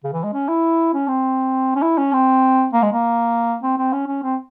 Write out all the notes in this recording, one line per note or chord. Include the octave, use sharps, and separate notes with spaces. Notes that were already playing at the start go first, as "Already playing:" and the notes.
C#3
E3
G#3
C#4
E4
C#4
C4
C#4
E4
C#4
C4
A#3
G#3
A#3
C4
C4
C#4
C#4
C4